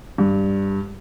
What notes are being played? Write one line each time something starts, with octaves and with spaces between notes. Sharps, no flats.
G2